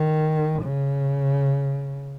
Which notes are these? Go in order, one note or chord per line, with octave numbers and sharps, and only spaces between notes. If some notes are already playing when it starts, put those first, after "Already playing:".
Already playing: D#3
C#3